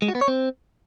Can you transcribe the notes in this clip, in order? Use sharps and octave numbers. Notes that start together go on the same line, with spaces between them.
G#3
F#4
B3
C#5
C4